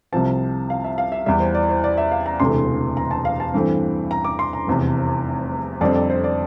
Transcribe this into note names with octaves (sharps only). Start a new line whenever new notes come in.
C2 C3 F3 C4 A5
F5
E5
F5
E5
E2 E3 G3 E5
C5
D5
C5
D5
E5
F5
A#5
E1 D2 C3 E3 A3 C6
A#5
A5
F5
A5
G2 E3 A3 C4
A#5
D6
C6
A#5
F1 E2 C3
F2 D3 G3 C4 D5
D5
C5
D5